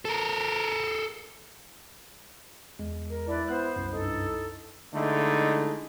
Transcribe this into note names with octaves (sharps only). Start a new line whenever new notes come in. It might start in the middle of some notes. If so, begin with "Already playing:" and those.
A4 A#4
E2 G#3
A#4
D4 E4 B4 D5
B3 C5 F#6
C2 F#2
G2 D#4 E4 A4
D3 G#3 A3 D#4 E4